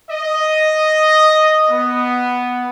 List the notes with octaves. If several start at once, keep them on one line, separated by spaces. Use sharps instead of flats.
D#5
B3